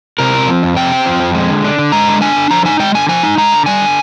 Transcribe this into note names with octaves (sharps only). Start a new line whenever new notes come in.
C3 A#4
C4
F3
F2
C3 G5
C4
F3
F2
G#3
D3
D4
D3
G#3 A#5
D3
D4 G#5
D3
F3 A#5
D#4 G#5
G#3 G5
D3 G#5
F3 G#5
D#4
G#3 A#5
D3
G3 G#5
D3